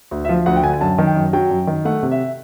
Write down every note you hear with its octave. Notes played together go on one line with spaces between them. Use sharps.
D2
E5
F3 F5
D2 F#5
G5
D3 G#5
G#5
F#2 A5
D#3
G5
F#2
F#3 G5
F#2
D#3
A3 F#5
C3
E5